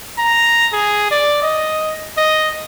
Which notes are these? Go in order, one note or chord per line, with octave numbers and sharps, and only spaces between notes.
A#5
G#4
D5
D#5
D#5